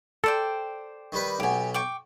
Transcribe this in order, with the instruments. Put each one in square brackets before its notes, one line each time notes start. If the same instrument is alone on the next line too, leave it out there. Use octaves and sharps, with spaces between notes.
[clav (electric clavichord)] A4 [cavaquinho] C5 D5 G5
[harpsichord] D#3 G3 B4
[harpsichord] B1 B2 [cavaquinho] G4 G#5
[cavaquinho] G5 C#6 D6